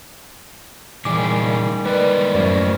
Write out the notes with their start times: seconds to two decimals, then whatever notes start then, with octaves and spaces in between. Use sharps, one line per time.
1.05 A#2 D#3 E3 G3 G#4 D6
1.86 G#3 A#3 B4 D5
2.35 F#2 A2 E4 F#4 A#4 C5 D5